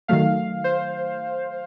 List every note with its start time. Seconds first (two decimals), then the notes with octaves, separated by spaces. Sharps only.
0.08 D#3 F#3 A3 F5
0.64 C5